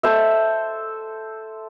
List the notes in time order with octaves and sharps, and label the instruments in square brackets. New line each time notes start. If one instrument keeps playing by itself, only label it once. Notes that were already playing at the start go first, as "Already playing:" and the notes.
[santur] A4 C5 E5